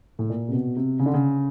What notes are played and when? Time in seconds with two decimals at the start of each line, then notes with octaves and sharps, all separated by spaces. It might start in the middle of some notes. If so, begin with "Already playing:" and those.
0.19 A2
0.30 A#2
0.48 C3
0.53 B2
0.76 C3
0.99 C#3
1.06 D3
1.14 C#3